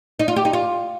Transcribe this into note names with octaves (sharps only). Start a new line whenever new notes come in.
D#4
F4
G4
D#4
F4